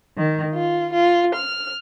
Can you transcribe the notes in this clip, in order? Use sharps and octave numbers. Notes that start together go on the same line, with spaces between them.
D#3
F4
F4
F6